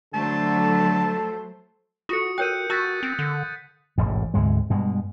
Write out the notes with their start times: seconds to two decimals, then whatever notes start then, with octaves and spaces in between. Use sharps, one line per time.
0.14 D3 F#3 A3 A4 C5 A5
2.09 F4 F#4 A4 D#6 C#7
2.38 A#4 C#5 G5 F#6 G6 D#7
2.70 F#4 A5 E6 F#6 A6 B6
3.03 C4
3.19 D3
3.98 E1 A1 G#2
4.34 D2 G#2 C3 G#3
4.70 G2 B2 G#3